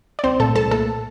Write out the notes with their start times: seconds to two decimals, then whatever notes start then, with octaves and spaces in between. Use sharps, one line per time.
0.19 D5
0.24 C2 C4 C5
0.40 A#2 A3 A4 A5
0.55 C2 A4 A5
0.71 A#2 A3 A4 A5